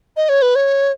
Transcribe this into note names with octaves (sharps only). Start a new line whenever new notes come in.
D#5
C#5
B4
C#5